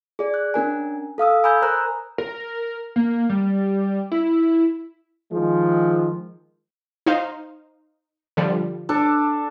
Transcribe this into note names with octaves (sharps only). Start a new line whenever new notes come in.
G#4 D5
F#6
C#4 D4 A#4 G#5
A4 F5 D#6 E6
G#5 A#5 B5 D#6 E6 G6
A#4 C5 A#5 F#6
A#4
A#3
G3
E4
D#3 F3 G#3
D#4 C5 F5
D3 F3 G3
D4 A4